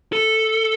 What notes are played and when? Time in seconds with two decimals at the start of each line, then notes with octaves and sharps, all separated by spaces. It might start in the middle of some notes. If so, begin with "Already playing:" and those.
0.13 A4